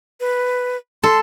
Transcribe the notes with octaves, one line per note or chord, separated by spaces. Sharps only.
B4
A4 C6